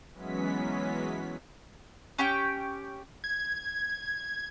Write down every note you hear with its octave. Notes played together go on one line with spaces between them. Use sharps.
E3 F#3 G#3 B3 C#4 B6
C#4 G4 G5
G#6